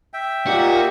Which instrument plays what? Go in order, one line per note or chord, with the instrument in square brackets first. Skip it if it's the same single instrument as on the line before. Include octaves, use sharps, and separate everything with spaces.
[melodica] E5 G5
[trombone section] A#2 [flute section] D#4 G4 [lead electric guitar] F#4